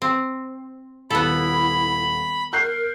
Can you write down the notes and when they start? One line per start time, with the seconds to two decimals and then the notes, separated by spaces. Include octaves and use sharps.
0.02 C4
1.10 D#1 B3 E4 A4 B5
2.53 A#4 F#6 G6 C7